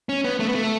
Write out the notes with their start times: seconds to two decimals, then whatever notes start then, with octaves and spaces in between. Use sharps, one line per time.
0.09 C#4
0.24 B3
0.40 A3
0.48 B3
0.55 A3